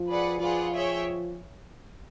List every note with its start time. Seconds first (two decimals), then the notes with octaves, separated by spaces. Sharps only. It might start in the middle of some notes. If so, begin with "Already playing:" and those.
Already playing: F3
0.08 G#4 B4 D5 F#5
0.40 F3 F4 G#4 B4 D5 F#5
0.72 G#4 C#5 E5 G5